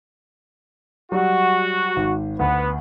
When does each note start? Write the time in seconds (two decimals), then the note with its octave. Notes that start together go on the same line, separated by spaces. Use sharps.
1.12 F#3 G3 F#4
1.96 G#1
2.39 D2 B3